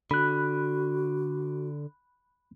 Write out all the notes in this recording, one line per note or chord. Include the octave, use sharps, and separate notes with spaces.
D3 F#4 B5 F#6